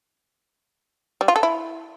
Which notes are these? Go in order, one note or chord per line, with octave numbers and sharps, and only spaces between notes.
G3
F4
A4
E4